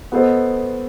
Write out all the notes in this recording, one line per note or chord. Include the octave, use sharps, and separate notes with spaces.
B3 F#4 A4 C5 D#5